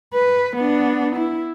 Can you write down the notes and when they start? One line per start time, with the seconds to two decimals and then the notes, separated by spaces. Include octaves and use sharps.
0.14 B4
0.56 B3 D4
1.16 E4